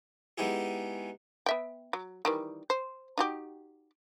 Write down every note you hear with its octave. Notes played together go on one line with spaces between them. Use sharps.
G#3 B3 D#4 E4 G4 G#4
B3 E5 G5
F#3
D#3 E3 G3
C5
D#4 F#4 G4